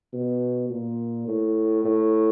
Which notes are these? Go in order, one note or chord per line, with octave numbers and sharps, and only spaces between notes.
B2
A#2
A2
A2